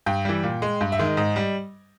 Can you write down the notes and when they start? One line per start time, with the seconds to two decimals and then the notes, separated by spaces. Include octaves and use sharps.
0.06 G2 G5
0.25 E3 G3
0.43 A#2
0.62 G#3
0.81 G2
0.92 E5
0.99 D#3 G#3
1.05 D#5
1.17 G#2 D#5
1.36 G3